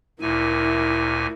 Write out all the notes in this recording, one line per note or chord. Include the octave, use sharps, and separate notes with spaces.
D2 A#2 E4 A#4 G#5